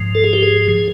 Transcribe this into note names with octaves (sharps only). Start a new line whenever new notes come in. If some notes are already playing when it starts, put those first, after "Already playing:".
Already playing: G#2 F3
A4
G#4
G4
G#4